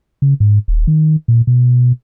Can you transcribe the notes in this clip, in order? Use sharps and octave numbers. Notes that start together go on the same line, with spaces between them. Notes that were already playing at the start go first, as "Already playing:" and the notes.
C#3
G#2
D#1
D#3
A#2
B2